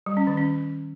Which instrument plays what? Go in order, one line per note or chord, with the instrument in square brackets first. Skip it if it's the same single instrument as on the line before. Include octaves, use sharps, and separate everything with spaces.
[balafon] G3
C#4
D#3
C#4